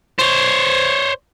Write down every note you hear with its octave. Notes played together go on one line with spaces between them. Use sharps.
C5 C#5